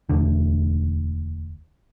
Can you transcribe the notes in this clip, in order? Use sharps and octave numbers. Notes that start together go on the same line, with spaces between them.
E1 D2 D3